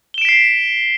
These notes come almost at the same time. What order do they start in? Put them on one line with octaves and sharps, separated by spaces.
G7 E7 D7 B6 C7